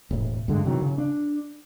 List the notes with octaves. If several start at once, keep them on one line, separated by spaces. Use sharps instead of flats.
E1 A2
G2 D3 G#3
C3 D#3 E3 F#3
C#3
D4